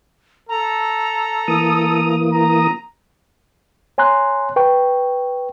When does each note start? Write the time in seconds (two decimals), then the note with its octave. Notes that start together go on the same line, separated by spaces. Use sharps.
0.49 A4 A#5
1.48 E3 A#3 D#6
2.32 A#5
3.98 C#5 G#5 A#5 C6 F#6
4.56 B4 G5 C#6